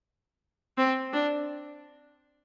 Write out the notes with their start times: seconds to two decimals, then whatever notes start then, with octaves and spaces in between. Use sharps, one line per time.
0.78 C4
1.13 D4